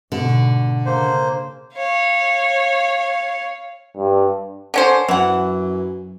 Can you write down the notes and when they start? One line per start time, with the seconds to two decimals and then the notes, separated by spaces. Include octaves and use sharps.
0.12 G#2 B2 D3
0.86 C#3 A#3 C5
1.75 C#5 F5
3.97 G2
4.74 D3 C#4 C5
5.08 F#2 E3 F#5